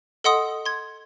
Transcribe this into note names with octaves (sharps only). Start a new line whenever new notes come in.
A4 D#5 F#5 C6 D#6
C6 G#6